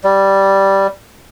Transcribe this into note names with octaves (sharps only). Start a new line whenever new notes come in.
G3